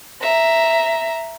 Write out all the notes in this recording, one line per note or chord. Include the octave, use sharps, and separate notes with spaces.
E5 A#5